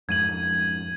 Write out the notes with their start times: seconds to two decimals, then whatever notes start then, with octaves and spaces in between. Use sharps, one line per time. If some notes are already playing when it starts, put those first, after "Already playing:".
0.09 F2 G#2 G#6 D#7 F#7